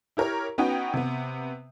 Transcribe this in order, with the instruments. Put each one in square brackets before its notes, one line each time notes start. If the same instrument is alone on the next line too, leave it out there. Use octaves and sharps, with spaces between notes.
[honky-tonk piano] E4 G4 A#4 C#5
B3 C#4 D#4 F#4 B4 G5
C3 B3